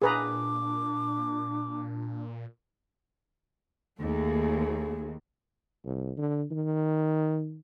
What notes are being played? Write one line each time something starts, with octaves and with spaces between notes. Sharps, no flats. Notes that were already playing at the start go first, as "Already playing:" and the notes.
A#2 D4 G#4 B4 A#5 D6
D#2 A3 G#4
C2
D3
D#3